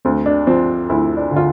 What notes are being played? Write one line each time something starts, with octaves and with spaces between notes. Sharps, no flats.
D2 C4
D4
F3 C4
D2 E4
D4
D3
F4